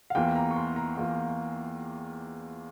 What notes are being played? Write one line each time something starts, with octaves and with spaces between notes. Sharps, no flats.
F5
E2 E3 A#3 F4 G5
A#5
C#6
C6
A#5
E2 E3 A#3 F4